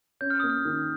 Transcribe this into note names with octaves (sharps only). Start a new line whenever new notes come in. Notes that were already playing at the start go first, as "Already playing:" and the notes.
C#4 G6
F6
A#3 D#6
F6
D#3